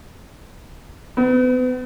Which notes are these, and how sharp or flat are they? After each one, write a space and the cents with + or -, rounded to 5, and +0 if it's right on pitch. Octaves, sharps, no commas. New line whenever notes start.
B3 +40